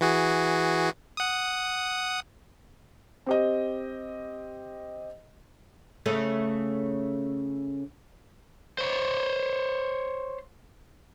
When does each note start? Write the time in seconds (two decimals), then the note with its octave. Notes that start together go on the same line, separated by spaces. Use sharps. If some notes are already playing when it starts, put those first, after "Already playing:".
0.01 E3 F#4 G#4
1.17 F#5 D#6
3.26 C4 G4 D#5
6.06 C#3 A3 C#4
8.78 C5 C#5